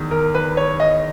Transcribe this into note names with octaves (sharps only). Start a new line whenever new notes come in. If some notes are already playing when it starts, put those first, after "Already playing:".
Already playing: E2 D#3
A#4
B4
C#5
D#5